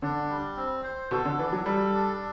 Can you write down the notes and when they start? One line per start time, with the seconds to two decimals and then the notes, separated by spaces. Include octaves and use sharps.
0.02 D3 D4
0.29 G3
0.57 C4
0.84 C5
1.11 B2 A4
1.25 D3
1.39 E3 D4
1.53 F#3
1.66 G3 A4
1.93 D4